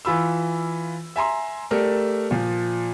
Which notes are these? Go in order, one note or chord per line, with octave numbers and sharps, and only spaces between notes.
E3 F4 B5 E6
E5 G#5 A#5 C6
A3 G4 A4 A#4 D5
A#2 F3